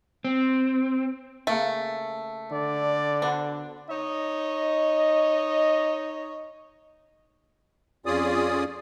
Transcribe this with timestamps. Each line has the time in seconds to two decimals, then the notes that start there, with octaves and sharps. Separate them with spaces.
0.25 C4
1.47 C#3 A3 A#3 C#4
2.52 D3 D5
3.22 B3 D4 F#4 C5
3.90 D#4 C#5 D#5
8.06 F2 C#4 F4 G#4 D5 D#6